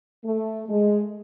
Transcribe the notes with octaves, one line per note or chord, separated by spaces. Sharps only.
A3
G#3